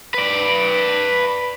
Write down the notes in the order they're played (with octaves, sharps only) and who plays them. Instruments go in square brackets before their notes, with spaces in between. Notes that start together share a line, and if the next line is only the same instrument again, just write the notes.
[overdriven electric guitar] B4 D5